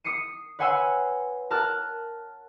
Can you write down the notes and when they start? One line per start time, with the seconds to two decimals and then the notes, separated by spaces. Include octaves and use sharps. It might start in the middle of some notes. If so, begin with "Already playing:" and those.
0.04 D#6 C7 C#7 D#7
0.59 B4 C#5 F#5 G#5 C6 E6
1.51 A#4 A5 F6 F#6